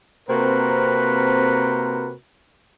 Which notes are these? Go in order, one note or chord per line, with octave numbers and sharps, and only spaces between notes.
C3 A#3 C4 F#4 A#4 B4